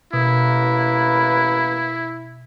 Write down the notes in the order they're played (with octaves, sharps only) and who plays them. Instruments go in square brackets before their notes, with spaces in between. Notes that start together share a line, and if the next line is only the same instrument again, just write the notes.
[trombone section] A1 A#3 B4 [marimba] B2 [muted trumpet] E4